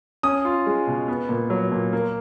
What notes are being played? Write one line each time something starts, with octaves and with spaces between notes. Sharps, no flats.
C#4 D#6
F4
G#3
B2
B3
A#2
F#3
A#2
A#3